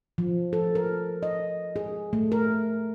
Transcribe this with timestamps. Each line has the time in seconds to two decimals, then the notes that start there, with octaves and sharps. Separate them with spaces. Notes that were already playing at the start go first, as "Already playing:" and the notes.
0.18 F3
0.53 A4
0.75 A#4
1.23 D#5
1.76 G#4
2.13 A3
2.32 A#4